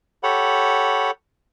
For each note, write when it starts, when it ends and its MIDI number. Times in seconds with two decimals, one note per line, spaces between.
0.23 1.11 67
0.23 1.11 69
0.23 1.11 73
0.23 1.11 78
0.23 1.11 83